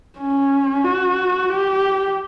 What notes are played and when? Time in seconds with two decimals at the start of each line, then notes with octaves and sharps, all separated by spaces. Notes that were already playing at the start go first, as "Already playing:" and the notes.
0.19 C#4
0.84 F#4
1.50 G4